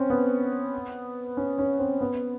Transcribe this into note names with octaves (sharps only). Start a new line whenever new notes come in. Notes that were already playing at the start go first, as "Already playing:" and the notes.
Already playing: C4 C#4
B3
C#4
C#4
C4
B3